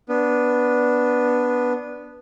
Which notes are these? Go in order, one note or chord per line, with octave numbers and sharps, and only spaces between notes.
B3 D4